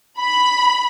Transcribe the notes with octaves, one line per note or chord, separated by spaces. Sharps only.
B5